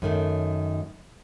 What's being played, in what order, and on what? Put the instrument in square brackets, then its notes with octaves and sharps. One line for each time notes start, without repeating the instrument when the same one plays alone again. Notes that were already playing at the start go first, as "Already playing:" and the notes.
[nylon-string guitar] F#2 D#3 A3